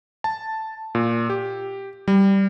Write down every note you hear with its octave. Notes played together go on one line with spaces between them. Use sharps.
A5
A#2
G4
G3